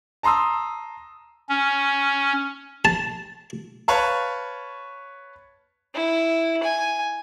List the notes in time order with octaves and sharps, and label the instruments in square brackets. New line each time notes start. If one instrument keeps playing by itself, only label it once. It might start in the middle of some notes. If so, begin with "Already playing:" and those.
[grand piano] A5 A#5 C6 D#6 E6
[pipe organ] C#4
[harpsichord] A5
[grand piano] B4 C#5 F5 A5
[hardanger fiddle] E4
G#5